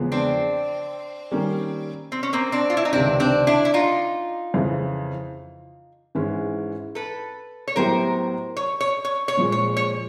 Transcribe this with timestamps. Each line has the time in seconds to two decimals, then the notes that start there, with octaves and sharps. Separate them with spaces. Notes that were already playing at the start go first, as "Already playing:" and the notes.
Already playing: E2 C#3 F3 G#3 B3
0.12 C4 D4
1.32 D#3 G3 A#3 C#4
2.12 C4
2.23 C#4
2.33 A#3 C4
2.52 C4 D4
2.70 F4
2.77 E4
2.85 D#4
2.93 C#2 C3 D#3 C4 D4
3.20 C4 D4
3.47 D4 E4
3.65 E4
3.74 D#4 F4
4.54 F2 C#3 E3
6.15 G#2 E3 G#3 C#4 E4
6.95 A4 B4
7.68 C#5
7.76 A2 F#3 B3 E4 G4 A#4 C5
8.57 C#5
8.81 C#5
9.05 C#5
9.28 C#5
9.37 A#2 F3 G#3
9.52 C#5
9.77 C#5